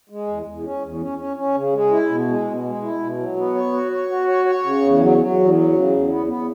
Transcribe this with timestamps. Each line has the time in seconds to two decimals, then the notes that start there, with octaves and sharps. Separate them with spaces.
0.10 G#3
0.27 E2
0.46 E2
0.64 C#4
0.82 E2
1.01 C#4
1.18 C#4
1.37 C#4
1.55 C#3
1.73 G#3
1.91 E4
2.09 B2
2.28 G#3
2.46 B2
2.64 G#3
2.82 E4
2.99 B2
3.18 F#3
3.36 B3
3.55 C#5
3.72 F#4
3.91 C#5
4.09 F#4
4.27 C#5
4.45 C#5
4.63 C#3
4.81 E2
5.00 F#3
5.18 F#3
5.36 E2
5.54 F#3
5.73 C#3
5.91 E2
6.08 B3
6.27 B3